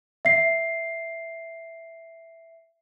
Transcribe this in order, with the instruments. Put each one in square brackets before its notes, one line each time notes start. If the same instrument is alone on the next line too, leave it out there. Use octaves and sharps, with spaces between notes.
[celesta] E5 C7